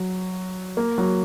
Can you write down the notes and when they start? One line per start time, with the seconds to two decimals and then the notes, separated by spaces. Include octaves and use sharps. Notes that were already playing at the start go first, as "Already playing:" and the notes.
Already playing: F#3
0.77 A#3
0.98 F#3